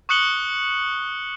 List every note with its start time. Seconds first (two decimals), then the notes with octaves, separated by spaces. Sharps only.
0.09 C#6 D#6 F#6 C#7 F#7 G7